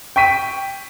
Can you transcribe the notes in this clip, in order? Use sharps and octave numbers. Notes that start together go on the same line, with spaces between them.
G5 C#6 B6 D#7